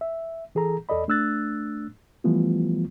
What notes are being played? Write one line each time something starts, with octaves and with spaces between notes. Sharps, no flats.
E5
E3 G#4 A4 A#5
E2 A4 D5 D#5 B5
A3 D4 E6 F#6 A6
E3 F3 G3 A3 B3 F4